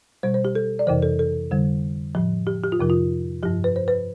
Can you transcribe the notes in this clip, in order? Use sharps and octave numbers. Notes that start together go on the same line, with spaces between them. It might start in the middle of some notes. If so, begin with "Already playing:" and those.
B2 G3 C5
C5
G4
A4
D5
F2 C3 E3 C5
A4
A4
F2 D3 G3
A2 F3
G4
G4
F4
F2 C3 F3
F4
G2 F3 G4
B4
C5
B4